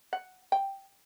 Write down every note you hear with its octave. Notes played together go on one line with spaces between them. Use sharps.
F#5
G5